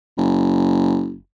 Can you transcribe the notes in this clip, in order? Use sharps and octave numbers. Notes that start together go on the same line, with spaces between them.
F#1